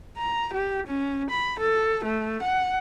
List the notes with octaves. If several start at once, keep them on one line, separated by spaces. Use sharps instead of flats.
A#5
G4
C#4
B5
A4
A3
F#5